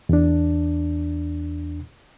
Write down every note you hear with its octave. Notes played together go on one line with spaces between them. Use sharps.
E2 D4